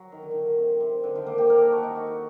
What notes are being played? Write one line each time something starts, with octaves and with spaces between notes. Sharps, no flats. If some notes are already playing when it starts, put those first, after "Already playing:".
Already playing: F#3
D#3
D3
D#3
C3
C3
D3
D#3
A#3
G4
A#4
A4
F#4
D#4
F#4
F#4